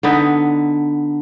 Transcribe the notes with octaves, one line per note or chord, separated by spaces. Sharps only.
D3 B3 D#4